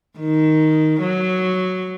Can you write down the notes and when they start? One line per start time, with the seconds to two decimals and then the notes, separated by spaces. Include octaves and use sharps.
0.19 D#3
1.01 F#3